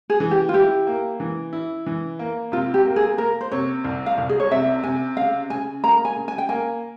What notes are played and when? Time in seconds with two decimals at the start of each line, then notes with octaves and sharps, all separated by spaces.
0.10 G#4
0.20 E3
0.31 G4
0.49 F4
0.53 E4 G4
0.87 A#3
1.20 E3
1.53 E4
1.86 E3
2.19 A#3
2.52 C3 F4
2.74 G4
2.85 A#3
2.96 G#4
3.18 A#3 A#4
3.41 C5
3.52 C3 C#5
3.84 C2
4.06 F5
4.18 C2
4.29 G#4
4.40 C#5
4.51 C3 E5
4.83 C3 G#5
5.17 C#3 F5
5.50 C#3 G#5
5.84 A#3 A#5
6.05 G#5
6.16 C#3
6.28 G#5
6.38 G5
6.49 A#3 G#5